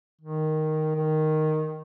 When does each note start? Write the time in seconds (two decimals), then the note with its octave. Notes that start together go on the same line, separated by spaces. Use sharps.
0.21 D#3
0.96 D#3